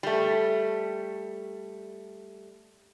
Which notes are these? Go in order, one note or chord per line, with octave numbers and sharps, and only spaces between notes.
G3 A3